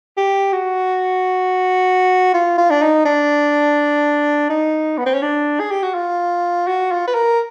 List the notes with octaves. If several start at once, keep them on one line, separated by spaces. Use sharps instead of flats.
G4
F#4
F4
F4
D4
D#4
D4
D#4
B3
C4
C#4
D4
G#4
G4
F#4
F4
F#4
F4
B4
A#4